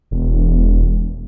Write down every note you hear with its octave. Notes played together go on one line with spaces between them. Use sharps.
E1